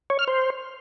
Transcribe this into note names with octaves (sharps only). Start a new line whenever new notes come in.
C#5
F6
C5